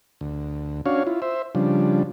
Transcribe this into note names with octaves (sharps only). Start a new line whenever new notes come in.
D2
C#4 D4 F#4 C#5 F5
E4 F4
C5 E5
C#3 F3 G3 D4